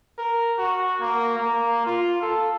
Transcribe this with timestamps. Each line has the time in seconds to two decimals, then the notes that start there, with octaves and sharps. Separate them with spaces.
0.18 A#4
0.58 F#4
1.00 A#3
1.38 A#3
1.86 F4
2.22 A4